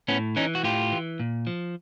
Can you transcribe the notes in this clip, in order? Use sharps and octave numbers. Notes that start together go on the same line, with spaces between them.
A2 B3 C#4
E3 C#4 D#4
F#4
A2 F4 G4
E3
A#2
F3